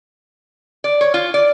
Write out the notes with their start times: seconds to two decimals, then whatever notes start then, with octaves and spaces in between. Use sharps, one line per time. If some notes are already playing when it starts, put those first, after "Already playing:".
0.84 D5
1.01 C#5
1.14 F4
1.34 D5